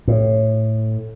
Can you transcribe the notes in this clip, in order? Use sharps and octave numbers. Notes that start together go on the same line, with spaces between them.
A2